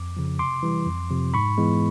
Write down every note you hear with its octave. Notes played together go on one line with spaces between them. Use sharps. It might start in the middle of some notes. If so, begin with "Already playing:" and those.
Already playing: F2 D6
C#3 F3
C3 C6 D6
E3 G3
F2
C3 F3
G#2 B5 C#6
E3 G#3 B3